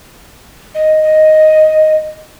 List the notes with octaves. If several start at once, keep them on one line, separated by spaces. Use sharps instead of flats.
D#5
D#5